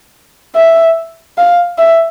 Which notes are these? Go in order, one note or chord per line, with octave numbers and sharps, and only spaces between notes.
E5
F5
E5